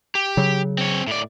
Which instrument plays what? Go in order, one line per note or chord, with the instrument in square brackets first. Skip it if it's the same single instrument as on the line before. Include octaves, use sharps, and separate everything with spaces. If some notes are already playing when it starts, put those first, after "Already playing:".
[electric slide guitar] G4
[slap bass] C#3 F#3
[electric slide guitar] C4 C#5
A2 D5